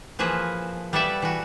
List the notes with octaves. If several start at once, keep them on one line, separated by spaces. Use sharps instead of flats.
E3 F3 A#3 G#4 B4
G3 B3 A4 B4 D5 E5
E3 F#4